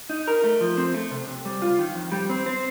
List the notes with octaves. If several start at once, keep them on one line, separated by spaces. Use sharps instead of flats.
D#4
A#4
A3
F3
C4
A3
C3
C3
G3
F4
D#3
F2
G3
C4
C4